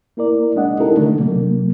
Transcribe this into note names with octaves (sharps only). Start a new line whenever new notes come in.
A#3 E4 A#4 D5
G#3 D4 D#5 F#5
C#4 D#4 E4 G4 A4 A#4
D3 D#3 A3 D4
C3 F#3 A#3